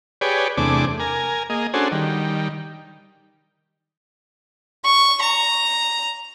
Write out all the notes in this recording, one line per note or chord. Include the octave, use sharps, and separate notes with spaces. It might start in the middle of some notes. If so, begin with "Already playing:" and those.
G4 G#4 B4 C#5 D5
E2 C3 A3 D4 G#4 D6
A#4 G#5
A#3 G#4 D#5
C#4 D4 F#4 G#4 A4 C5
D#3 G3
C#6
A#5